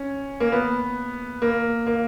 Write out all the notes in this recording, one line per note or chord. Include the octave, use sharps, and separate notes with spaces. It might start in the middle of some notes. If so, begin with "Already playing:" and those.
Already playing: C#4
A#3
B3
A#3
A#3